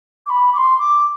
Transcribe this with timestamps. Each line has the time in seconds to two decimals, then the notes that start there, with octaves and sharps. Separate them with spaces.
0.26 D6
0.30 B5
0.53 D6
0.57 C6
0.79 D6